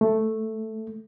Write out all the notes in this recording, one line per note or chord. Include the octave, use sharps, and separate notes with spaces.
A3